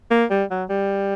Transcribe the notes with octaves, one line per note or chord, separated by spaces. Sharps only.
A#3
G3
F#3
G3